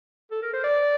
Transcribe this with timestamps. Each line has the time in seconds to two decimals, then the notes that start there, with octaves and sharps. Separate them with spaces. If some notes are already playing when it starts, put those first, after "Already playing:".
0.31 A4
0.42 A#4
0.53 C5
0.64 D5